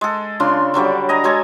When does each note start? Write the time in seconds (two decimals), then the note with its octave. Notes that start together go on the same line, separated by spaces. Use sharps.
0.01 G#3 A4
0.40 C#3 D4 F4 C6
0.74 D3 F#3 G3 D5
1.09 D#5 G#5 A#5
1.24 F#3 G#3 A4 G#5